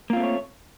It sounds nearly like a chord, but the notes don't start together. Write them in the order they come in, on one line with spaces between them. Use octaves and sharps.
A#3 F4 C4 A3 C#5